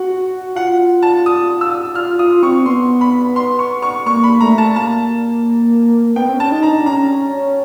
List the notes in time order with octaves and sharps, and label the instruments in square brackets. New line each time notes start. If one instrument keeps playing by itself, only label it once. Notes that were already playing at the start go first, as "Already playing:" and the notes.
Already playing: [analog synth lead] F#4 [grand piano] F#5
[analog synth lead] F4 [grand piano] F#5
[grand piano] A5
D#6
E6
[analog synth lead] F4 [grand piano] F6
[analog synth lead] F4 [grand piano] D#6
[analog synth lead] C4 [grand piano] C#6
[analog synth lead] B3 [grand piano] C6
[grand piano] B5
C6
C#6
C#6
[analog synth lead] A#3 [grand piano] C#6
[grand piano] B5
[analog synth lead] A3 [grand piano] A#5
[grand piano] A5
[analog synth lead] A#3 [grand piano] A5
[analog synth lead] B3 [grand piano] G5
[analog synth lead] C4
C#4
[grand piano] A5
[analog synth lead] D#4
[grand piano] A#5
[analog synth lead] D4
[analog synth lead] C#4 [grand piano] A#5